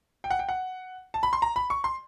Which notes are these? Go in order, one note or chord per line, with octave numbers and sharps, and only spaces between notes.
G5
F#5
G5
F#5
A5
B5
C6
A#5
B5
C#6
C6